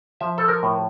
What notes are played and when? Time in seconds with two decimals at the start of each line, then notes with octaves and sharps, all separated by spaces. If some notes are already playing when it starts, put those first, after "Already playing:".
0.21 F3 E5
0.38 A4
0.48 A#4
0.63 A2